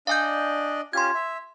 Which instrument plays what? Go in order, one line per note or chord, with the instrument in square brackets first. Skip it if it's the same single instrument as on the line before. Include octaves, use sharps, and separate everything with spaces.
[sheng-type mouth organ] D4 D5 D#5 [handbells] F5 G#5 G6
[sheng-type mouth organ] C#4 F4 G4 [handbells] C6 G#6
[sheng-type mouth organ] E5